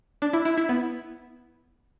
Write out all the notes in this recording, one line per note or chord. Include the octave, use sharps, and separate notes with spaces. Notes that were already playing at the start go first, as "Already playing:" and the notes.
D4
E4
E4
E4
B3